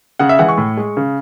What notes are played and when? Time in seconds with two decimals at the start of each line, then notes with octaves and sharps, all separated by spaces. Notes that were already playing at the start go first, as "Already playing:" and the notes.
0.19 C#3 F#5
0.29 E5
0.39 E3 G#3 F#5
0.49 C#6
0.58 A2
0.77 G#3
0.97 C#3